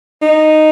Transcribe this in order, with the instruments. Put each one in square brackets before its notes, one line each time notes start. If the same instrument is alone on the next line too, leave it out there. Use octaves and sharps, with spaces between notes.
[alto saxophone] D#4